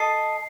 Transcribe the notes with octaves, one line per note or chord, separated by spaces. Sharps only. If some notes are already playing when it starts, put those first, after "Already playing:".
Already playing: A4 D#5 A5 D#6 C7